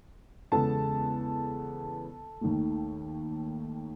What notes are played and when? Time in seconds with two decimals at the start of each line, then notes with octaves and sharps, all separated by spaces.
0.52 E2 C#3 G#3 B3 A4 A5
2.41 D#2 D#3 A3